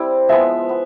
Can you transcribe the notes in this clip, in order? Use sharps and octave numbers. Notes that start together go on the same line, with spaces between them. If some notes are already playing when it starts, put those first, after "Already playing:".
Already playing: G3 C4 E4
F3 G#3 B3 E5
B3